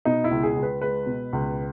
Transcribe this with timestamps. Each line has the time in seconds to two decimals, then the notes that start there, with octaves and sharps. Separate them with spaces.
0.05 B2 D#4
0.24 E4
0.31 C#2
0.43 G#4
0.56 C#2
0.63 B4
0.81 G#3 B4
1.06 B2
1.33 C#2